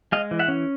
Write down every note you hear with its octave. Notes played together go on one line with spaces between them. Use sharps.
G#3 D#5 F5
E3
E5 F#5
C#4